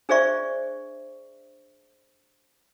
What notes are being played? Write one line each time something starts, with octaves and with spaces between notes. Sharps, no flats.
D4 G#4 C5 D5 E5 C#6